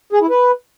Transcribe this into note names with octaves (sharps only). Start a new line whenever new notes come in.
G#4
E4
B4